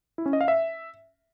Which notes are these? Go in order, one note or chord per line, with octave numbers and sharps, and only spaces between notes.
E4
C#4
D#5
F5
E5